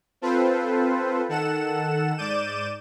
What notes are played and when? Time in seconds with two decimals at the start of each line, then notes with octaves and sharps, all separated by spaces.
0.22 C4 F4 A4 B4 C5
1.29 D#3 A4 F#5 E7
2.17 G#2 D5 D6 G6 D#7 E7